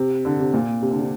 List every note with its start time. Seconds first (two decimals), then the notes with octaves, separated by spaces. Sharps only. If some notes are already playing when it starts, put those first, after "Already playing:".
Already playing: C3
0.25 D3
0.40 C3
0.54 A#2
0.82 C3
0.91 D3
1.00 C3